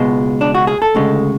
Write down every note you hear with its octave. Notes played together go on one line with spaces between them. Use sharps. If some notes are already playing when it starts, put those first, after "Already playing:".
Already playing: C#2 B2 G#3
D4
F#4
G#4
A4
D2 C#3 G#3